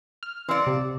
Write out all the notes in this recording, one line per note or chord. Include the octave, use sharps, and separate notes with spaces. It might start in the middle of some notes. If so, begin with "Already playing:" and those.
F6
E3 C4 D5 F5 C#7
C3